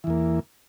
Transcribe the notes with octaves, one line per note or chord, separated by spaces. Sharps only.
E2 E3 A#3